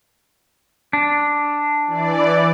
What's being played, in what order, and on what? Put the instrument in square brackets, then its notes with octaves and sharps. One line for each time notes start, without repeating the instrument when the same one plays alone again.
[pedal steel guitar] D4
[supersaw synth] E3 D5